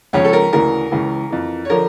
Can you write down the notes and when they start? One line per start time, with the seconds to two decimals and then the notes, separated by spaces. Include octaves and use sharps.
0.13 C#2 C#3 F3 C#5
0.25 A4
0.33 A#4
0.52 D2 C#3 E3 A#4
0.91 C#2 C#3 E3
1.31 F2 E3
1.65 C#5
1.70 D3 F3 A#4